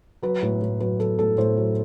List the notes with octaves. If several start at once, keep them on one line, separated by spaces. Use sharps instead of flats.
F#3 B4
A2
A2
F#3 B4
F#3 A4
A2 A4
A2 C5
F#3